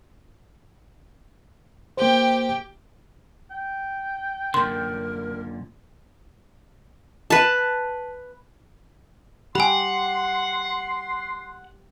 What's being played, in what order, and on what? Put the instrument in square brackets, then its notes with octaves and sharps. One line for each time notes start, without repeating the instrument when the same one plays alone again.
[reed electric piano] A#3 C5 [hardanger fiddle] G4 G5
[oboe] G5
[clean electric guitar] F#2 A#2 D3 [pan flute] A#4 [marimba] C6
[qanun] B4 A5
[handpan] G4 [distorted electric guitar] F#5 [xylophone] G#5 B5 [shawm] C6